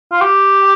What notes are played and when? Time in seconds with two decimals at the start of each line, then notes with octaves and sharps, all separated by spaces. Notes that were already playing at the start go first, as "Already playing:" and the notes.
0.12 F4
0.21 G4